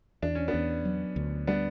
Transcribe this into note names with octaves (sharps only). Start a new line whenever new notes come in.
E2 D4
C#4
B3 D4
E2
F#3
D2
G3 B3 D4